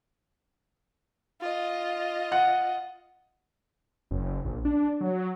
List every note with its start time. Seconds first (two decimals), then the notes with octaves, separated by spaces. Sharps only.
1.40 F4 D#5
2.32 F#5
4.11 F#1
4.45 A#1
4.65 D4
5.01 F#3